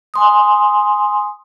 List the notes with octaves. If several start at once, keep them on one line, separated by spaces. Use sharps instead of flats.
G#5 C6 D#6